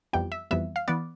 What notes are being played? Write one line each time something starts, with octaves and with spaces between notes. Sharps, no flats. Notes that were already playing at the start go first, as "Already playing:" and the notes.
F2 E3 G3 B3 G5
E5
F2 E3 G3 B3 E5
F5
E3 B3 D5